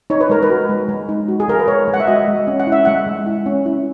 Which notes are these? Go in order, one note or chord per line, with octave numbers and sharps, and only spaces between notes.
D#4 C#5
B4
G#3 A#4
B4
F#4
G#3
G#3
D#4
F#4
G#4
G#3 A#4
B4
G#3 C#5
G#3
F#5
E5
F#4 D#5
G#3
C#4
F#5
E4
E5
G#3 F#5
G#3
E4
C#4
E4